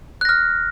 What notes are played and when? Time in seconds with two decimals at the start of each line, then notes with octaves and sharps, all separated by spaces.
0.21 F#6
0.25 A#6
0.29 F6